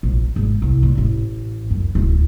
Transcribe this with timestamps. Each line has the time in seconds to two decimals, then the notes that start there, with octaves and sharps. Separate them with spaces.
0.03 A#1
0.36 G#1
0.62 C2
0.83 A#2
0.98 A1
1.71 F#2
1.95 D1